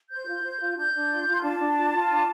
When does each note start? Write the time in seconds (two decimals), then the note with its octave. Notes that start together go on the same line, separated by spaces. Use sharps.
0.10 C5 G6
0.27 F4
0.43 C5
0.60 F4
0.77 D4 G6
0.93 D4
1.10 F4
1.26 F4
1.32 C6
1.42 D4 A5
1.59 D4
1.76 F4
1.92 F4
2.09 D4